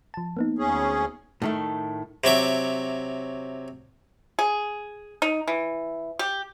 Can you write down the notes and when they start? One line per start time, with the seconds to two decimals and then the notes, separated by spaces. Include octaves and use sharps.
0.14 F3 A5
0.37 A#3 B3 D#4
0.58 D2 C#4 G#4
1.42 A2 D#3 A3
2.24 C3 F#3 E5 D6
4.39 G#4
5.22 D#4
5.48 E3
6.19 G4